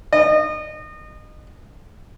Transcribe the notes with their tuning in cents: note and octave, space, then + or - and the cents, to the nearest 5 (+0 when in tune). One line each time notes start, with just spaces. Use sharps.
D#5 -30